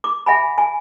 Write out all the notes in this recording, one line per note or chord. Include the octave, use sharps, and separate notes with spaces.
D6
E5 F#5 G#5 B5
G#5